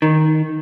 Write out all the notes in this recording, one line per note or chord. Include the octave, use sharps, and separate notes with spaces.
D#3